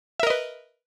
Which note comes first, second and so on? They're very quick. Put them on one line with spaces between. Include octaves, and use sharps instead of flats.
E5 A#4 D#5 B4